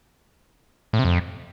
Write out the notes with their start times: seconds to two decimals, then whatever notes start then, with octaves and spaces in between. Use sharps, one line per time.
0.93 A2
0.99 C3
1.05 F2